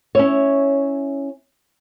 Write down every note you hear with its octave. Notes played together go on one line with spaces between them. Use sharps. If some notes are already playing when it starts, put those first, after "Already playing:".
C#4 E4 C#5